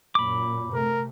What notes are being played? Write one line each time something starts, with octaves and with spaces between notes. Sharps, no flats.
F#2 A#2 B5 D6
C3 A3 A#4